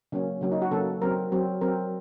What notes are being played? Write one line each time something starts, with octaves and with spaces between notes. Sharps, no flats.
C#3 F#3 A#3 C#4
C#3 F#3 A#3 C#4
D#4
F#4
C#3 F#3 A#3 C#4 A4
F#3 C4 A#4
F#3 C4
F#3 C4 A#4